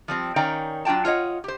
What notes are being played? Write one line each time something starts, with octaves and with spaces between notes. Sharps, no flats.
F3 G3 C4
D#3 C#4 D5 F5 G5 A#5
F#3 D4 F4 G5 A5
F4 C#5 D#5 F#5
G4 C5